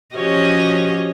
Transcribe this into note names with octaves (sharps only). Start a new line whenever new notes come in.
F3 C#4 F#4 G4 C#5 D#5